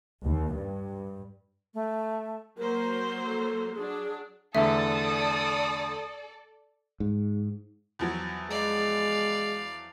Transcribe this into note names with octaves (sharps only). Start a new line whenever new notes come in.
D#2
G2
A3
F#3 A#3 A#4 C5
A4
F#3 D4 G#4
E2 D3 A3 A4 D5 E5 D#6
G#2
E2 F3 F#3
G#3 D5 F5